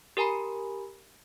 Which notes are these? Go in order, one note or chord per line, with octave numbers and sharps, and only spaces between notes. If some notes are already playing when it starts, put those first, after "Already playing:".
G4 A#4 G#5 A#5 B5